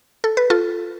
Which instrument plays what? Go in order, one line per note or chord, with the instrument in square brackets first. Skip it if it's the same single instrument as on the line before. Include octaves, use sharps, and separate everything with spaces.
[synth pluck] A4
B4
F4 A4